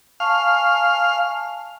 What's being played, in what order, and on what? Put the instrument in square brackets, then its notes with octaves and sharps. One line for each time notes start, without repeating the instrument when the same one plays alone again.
[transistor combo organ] F5 [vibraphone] G#5 A5 C#6